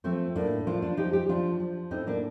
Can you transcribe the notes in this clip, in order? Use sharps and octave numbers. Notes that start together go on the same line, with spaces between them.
F3 A3 C4
A2 A#3 D4
F3 D4 F4
D4 F4
F3 D#4 G4
D#4 G4
F3 D4 F4
F3
A2 C4 D#4
A#3 D4